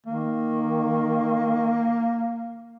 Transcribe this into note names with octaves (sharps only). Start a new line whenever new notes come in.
D#3 A#3